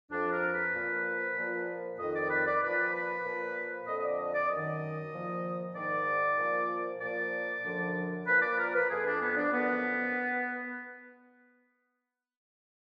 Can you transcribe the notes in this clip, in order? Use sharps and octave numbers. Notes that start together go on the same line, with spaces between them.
F2 F3 D4
A#4
B4
A#2 F3
A#2 F3
F2 D#3 D#5
D5
B4
D5
A#2 F3 B4
B4
A#2 F3
F2 D3 F3 D#5
D#5
D5
D#5
D5
F#2 D#5
D#3
A#2 F3
G#2 D#3 D5
A#2 F3
A#2 F3 D5
F#2 D3 F3
A#2 F3 B4
D5
A#4
B4
F2 F3 G#4
D4
B3
D4
F#2 D3 F3 B3